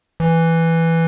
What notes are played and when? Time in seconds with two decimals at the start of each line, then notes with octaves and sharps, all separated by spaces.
0.20 E3